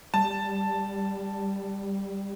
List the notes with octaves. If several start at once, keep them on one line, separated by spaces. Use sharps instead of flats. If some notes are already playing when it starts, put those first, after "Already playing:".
G3 A5